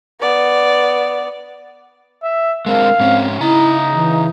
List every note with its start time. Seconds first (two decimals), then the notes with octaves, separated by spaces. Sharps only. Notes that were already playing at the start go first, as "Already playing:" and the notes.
0.21 B3 D5
2.23 E5
2.66 G#3 C4 D4 A#4 F5
3.00 G#2 C4 C#4
3.41 C#3 D#4 E4 A#5
3.93 E3